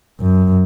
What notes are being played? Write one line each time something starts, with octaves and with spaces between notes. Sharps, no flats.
F#2